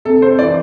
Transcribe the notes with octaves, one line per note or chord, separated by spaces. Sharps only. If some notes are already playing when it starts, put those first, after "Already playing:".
C3 A4
C5
E3 D5